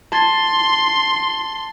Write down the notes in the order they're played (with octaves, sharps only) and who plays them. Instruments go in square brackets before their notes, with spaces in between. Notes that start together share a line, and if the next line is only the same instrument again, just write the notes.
[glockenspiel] A5 G#6 A6 [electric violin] C6